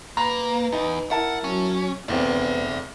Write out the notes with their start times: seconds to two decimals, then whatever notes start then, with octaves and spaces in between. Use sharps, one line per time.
0.17 A#3 B4 A#5 B5
0.72 E2 D#4
1.11 E4 A#4 F#5 A5
1.44 F#3 C#4
2.08 F1 E2 B3 C4 D5 E5